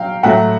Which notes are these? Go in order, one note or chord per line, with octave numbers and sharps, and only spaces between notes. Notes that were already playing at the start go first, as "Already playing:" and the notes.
Already playing: F#3 F5 G5
A2 F#3 A3 E5 F#5